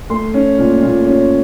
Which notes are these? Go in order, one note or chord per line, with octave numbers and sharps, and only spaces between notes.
A3 C6
C#4
A#2
A#2
C#4